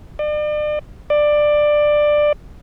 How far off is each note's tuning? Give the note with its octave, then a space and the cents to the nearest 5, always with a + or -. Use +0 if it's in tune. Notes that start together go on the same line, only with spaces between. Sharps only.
D5 +40
D5 +15